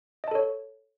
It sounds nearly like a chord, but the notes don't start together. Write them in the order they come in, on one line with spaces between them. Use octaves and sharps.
D#5 A5 A4 C#5